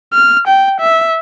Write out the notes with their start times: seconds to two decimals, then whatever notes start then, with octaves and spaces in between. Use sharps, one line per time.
0.13 F6
0.48 G5
0.81 E5